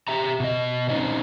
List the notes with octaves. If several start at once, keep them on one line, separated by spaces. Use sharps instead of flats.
G4 E5 A#5
B2 D#5
A#2 C4 C#4 D#4 C5 D#5